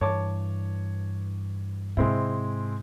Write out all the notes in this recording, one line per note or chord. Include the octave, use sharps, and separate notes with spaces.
G2 E3 C#5 A5 D6
G#2 C3 G#3 C4 E4